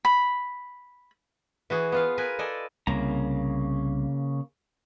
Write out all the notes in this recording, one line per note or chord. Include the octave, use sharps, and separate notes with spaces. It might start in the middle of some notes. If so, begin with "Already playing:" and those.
B5
E3 F#4 G#4
B3 F4 F5
A#4 B4 G#5
A4 D5 D#5 G#5
C2 C#3 A#3 A#5